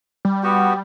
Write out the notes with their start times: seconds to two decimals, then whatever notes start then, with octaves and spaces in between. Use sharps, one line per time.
0.25 G3
0.43 B3 F#4 G4